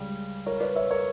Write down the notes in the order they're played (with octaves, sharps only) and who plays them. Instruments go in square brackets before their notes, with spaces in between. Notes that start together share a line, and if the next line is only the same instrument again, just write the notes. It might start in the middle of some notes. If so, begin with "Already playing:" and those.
Already playing: [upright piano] C#2 C#3 G3
[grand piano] A#4 C#5
B4 D5
C#5 E5
A#4 C#5